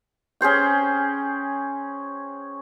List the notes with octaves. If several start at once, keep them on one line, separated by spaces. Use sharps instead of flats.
C#4 G#4 C5 G5